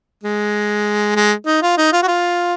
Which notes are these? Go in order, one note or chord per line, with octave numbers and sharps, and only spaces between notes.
G#3
G#3
D#4
F4
D#4
F4
F#4
F4